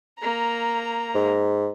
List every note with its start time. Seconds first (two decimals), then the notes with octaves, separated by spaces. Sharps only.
0.19 A#3 A#5
1.15 G#2